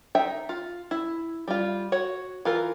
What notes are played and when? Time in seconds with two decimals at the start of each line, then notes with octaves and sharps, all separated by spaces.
0.15 D#4 E5 G5
0.49 F4
0.91 E4
1.48 G3 F4
1.92 F#4 C#5
2.45 E3 F4 A#4